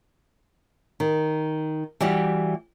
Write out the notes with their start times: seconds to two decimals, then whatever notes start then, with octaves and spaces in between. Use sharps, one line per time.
1.00 D#3
2.01 E3 G3 F#4 G4